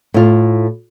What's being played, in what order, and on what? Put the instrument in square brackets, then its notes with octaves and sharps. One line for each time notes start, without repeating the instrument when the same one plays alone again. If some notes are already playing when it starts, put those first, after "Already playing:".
[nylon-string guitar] A2 F4